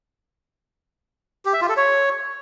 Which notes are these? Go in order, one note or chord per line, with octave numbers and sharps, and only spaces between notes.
G4
E5
F4
A4
C#5